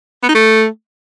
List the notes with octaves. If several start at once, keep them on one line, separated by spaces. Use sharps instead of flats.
B3
D#4
A3